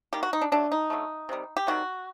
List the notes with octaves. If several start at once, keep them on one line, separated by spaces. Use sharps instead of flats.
D#3 G3 A#3 G4
F#4
D#4
D4
D3 F#3 A3 D4
D#4
D3 F#3 A3
C3 D#3 G3
G4
C3 D#3 G3 F#4